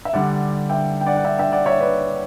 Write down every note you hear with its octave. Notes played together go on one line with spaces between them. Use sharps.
E5
D3 G3 D5 F#5
E5 G5
G5
D5 F#5
F#5
E5 G5
E5 G5
D5 F#5
C#5 E5
B4 D5